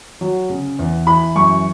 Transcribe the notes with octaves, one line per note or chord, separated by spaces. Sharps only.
F#3
C#3
E2
E3 B5
F#2 C#6